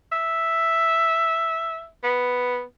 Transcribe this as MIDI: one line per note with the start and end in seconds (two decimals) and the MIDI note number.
0.12 1.87 76
2.04 2.63 59